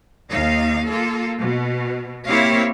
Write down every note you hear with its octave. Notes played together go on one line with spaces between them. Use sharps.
D#2 D#4 F5
A#3 F4 A4
B2
A#3 C4 E4 G4 C#5 F5